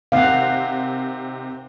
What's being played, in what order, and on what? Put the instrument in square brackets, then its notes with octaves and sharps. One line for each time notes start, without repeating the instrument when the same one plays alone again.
[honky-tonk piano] C3 D#3 C4 [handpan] F5 F#5